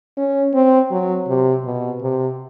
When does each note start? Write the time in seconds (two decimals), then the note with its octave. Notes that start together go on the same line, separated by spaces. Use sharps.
0.17 C#4
0.54 C4
0.91 F#3
1.29 C3
1.65 B2
2.02 C3